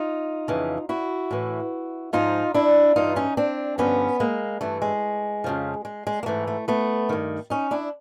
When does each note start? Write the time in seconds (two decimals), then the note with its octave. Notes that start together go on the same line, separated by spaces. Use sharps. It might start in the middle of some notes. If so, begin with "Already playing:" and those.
Already playing: D#4 F4
0.48 F2 C#3 E3
0.89 E4 F#4
1.31 A2 E3
2.13 G#2 F3 D#4 F4
2.54 D4 E4
2.96 G2 E3 D#4 F4
3.16 C#4 D#4
3.37 C4 D4
3.78 G2 D3 F3 B3 C#4
4.20 G#3 A#3
4.61 G2 E3 A3
4.82 G#3
5.44 F2 C#3 F3
5.85 G#3
6.07 G#3
6.23 A#3
6.26 G#2 E3 A3
6.47 A3
6.68 A3 B3
7.09 G2 D#3
7.50 C#4 D#4
7.71 D4 E4